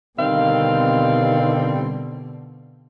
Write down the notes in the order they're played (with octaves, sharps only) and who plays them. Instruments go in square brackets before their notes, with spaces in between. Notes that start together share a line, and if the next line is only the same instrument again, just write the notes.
[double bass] B2 D3 [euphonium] D#3 [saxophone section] G3 C4 [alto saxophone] F5